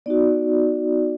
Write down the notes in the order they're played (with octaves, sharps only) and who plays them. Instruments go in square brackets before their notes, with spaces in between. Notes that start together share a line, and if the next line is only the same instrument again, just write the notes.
[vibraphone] B3 D#4 F#4 D5